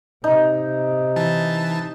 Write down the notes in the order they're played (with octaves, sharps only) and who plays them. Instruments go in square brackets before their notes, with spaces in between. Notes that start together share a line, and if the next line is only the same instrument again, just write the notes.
[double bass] C3 [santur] D#4
[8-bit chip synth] E3 A5